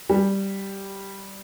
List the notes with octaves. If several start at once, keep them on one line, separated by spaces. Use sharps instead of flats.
G3